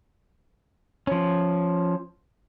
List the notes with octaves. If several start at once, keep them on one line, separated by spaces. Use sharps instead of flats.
F3 C#4